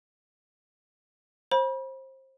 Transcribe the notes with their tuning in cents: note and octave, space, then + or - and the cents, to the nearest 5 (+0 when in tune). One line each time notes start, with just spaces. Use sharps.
C5 +25 B5 -35